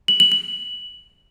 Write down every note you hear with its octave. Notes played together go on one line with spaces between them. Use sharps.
F#7
F#7
F#7